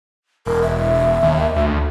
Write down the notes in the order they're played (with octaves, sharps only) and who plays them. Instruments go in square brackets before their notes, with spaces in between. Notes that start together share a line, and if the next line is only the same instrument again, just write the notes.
[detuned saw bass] E1 [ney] A#4
[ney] E5
[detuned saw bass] D#2
D2